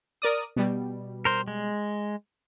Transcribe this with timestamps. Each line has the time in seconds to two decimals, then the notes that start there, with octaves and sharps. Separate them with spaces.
0.22 A#4 D5 D#6
0.56 B2 G3
1.25 A#4 C5
1.48 G#3